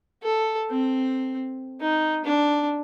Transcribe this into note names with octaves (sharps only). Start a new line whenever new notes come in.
A4
C4
D#4
D4